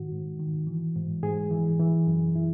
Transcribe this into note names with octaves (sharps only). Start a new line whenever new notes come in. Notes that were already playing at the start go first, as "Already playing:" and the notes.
Already playing: G#2 D#3 F#4
G#2
D#3
E3
G#2
G#2 G#4
E3
E3
F#2
E4